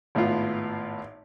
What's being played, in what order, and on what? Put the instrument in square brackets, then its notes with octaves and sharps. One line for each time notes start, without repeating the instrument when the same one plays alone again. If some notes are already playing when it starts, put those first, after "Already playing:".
[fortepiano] G#1 A2 B3 F4